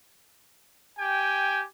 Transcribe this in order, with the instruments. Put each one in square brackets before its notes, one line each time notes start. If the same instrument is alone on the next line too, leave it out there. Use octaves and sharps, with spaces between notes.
[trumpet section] G4 G5 G#5